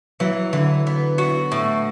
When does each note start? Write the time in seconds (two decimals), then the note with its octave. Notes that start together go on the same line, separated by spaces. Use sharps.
0.20 E3 F#3
0.53 D3 E3
0.87 B3
1.18 F#4
1.52 A2